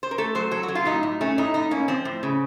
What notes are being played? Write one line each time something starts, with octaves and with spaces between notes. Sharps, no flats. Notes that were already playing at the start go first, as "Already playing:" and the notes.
C5
A#4
A3 A4
F#3 C5
F#3 A4
F#4
F#3
F4
A2 D#4
A2
A3 C#4
A2 D#4
A2 D#4
A#3 C#4
F3 C4
A2
C#3